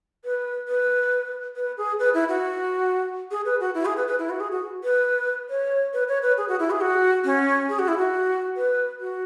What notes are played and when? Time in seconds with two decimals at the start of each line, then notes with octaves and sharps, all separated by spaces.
0.25 B4
0.68 B4
1.56 B4
1.78 G#4
2.00 B4
2.14 E4
2.29 F#4
3.31 G#4
3.45 B4
3.60 F#4
3.75 E4
3.85 G#4
3.97 B4
4.07 B4
4.19 E4
4.30 F#4
4.40 G#4
4.52 F#4
4.84 B4
5.50 C#5
5.94 B4
6.08 C#5
6.22 B4
6.38 G#4
6.48 F#4
6.59 E4
6.71 G#4
6.81 F#4
7.25 C#4
7.69 G#4
7.79 F#4
7.88 E4
7.98 F#4
8.57 B4
9.01 F#4